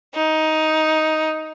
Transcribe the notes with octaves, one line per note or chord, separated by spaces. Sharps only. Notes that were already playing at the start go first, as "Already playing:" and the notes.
D#4